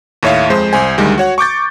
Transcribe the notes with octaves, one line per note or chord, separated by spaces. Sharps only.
D#2 A2 C#5 E5 F5
F2 G#3 C5
C2 C5 G#5
D2 D#3 G3 G#3
F#4 C#5 F#5
C#6 D6 G6 A6